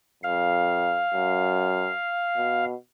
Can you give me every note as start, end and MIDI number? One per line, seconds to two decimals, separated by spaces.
0.23 1.01 41
0.23 2.65 77
1.14 1.90 42
2.37 2.74 47